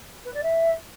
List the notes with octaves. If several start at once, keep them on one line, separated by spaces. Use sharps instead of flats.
B4
D5
E5